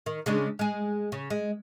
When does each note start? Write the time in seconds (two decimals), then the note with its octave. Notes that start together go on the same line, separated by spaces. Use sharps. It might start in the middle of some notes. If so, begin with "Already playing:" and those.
0.06 D#3
0.26 C#3 G#3 D4
0.59 G#3 G#4
1.12 C#3
1.30 G#3